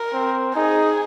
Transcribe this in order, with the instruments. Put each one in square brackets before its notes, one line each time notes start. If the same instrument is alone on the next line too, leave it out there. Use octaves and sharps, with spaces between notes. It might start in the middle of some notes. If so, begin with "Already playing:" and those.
Already playing: [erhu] A#4
[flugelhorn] C4
[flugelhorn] D#4 [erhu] G#4